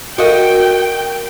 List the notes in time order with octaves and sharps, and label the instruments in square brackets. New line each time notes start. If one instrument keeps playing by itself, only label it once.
[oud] F#4 D5 D#5 [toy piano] A4 A#4 F5 [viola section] G5